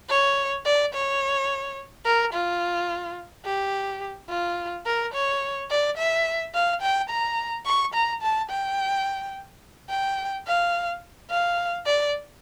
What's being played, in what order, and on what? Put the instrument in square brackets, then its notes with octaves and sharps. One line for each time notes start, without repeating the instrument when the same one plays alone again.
[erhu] C#5
D5
C#5
A#4
F4
G4
F4
A#4
C#5
D5
E5
F5
G5
A#5
C#6
A#5
A5
G5
G5
F5
F5
D5